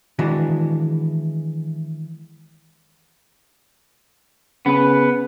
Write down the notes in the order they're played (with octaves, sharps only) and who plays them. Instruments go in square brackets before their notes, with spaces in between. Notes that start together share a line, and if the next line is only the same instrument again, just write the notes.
[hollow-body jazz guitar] D#3 E3 G#3 D4 F#4 G#4
[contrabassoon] C#3 [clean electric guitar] B3 B4